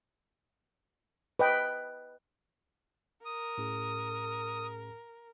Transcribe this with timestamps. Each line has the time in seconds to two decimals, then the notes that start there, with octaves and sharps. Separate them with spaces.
1.39 B4 D#5 G5
3.25 A#4 D#6
3.58 A2 C#4 G#4